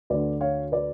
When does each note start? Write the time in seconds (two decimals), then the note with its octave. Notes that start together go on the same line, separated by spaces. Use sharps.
0.10 D2 D3 B4 D5
0.41 C#5 F5
0.72 B4 D5